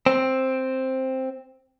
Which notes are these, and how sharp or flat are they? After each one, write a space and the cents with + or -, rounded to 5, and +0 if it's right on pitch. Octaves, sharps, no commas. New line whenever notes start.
C4 +5